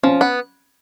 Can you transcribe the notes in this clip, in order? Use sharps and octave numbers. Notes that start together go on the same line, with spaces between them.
F3 C#4
B3